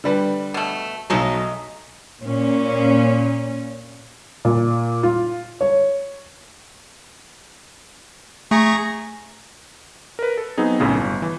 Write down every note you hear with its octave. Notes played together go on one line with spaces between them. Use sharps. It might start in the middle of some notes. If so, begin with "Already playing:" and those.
D3 G3 B4
B2 A3
B1 F#3 G#3 A3 D#4
A#2 C#4
A#2
F4
C#5
A3 G#4 A#5 C#6
A#4 B4
A4
F#3 B3 C4 D#4 G#4
B1 F#2 A2 C#3
G1
E3